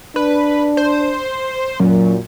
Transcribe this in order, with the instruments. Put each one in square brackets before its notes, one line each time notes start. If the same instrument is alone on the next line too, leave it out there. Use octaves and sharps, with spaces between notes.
[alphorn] D4 [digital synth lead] B4
[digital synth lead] C5
[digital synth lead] F#2 [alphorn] A#2